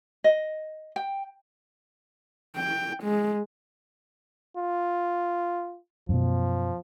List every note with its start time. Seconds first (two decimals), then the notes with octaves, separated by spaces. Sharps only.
0.24 D#5
0.96 G5
2.56 G5
3.03 G#3
4.58 F4
6.09 F#2 B2 F3